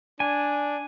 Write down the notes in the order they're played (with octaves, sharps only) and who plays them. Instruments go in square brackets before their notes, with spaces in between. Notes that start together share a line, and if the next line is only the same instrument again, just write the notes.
[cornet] D4 [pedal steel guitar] G#5